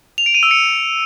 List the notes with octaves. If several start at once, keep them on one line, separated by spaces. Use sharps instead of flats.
F7
D7
D#7
E6
C#7